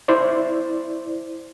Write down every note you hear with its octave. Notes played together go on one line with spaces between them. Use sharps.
E4 C5 D5